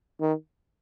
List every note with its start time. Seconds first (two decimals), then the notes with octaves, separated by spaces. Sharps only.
0.21 D#3